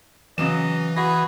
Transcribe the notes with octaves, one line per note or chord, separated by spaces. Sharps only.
C#3 E3 F#3 D#5 E7
E4 F#4 G#4 B4 A#6